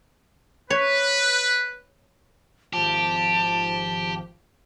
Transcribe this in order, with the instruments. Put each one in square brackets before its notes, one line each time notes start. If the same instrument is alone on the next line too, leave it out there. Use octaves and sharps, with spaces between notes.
[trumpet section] B4 [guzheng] C#5
[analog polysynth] G#1 F3 [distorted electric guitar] G4 [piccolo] A5